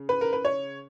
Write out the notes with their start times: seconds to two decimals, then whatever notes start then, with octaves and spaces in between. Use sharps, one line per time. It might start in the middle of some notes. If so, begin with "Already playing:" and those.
Already playing: C#3
0.09 B4
0.21 A#4
0.33 B4
0.45 C#5